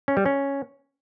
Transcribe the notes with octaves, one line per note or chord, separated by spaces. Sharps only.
C#4
G3
C#4